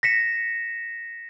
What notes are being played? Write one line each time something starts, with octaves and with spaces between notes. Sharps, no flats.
A#6 B6 C#7 E7